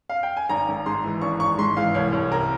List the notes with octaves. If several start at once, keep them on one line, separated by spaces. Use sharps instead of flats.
F5
G5
G#5
G#1 A#5
G#1
G#2 C6
E3
G#1 C#6
G#1 C#6
G#2 C6
E3 F5
C2 C#5
C2
C3 A#4